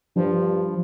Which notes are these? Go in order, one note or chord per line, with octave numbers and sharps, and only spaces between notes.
G2 F3